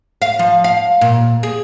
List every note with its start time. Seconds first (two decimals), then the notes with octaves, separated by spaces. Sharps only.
0.22 F5
0.39 F3
0.64 F5
1.01 A#2
1.43 G#4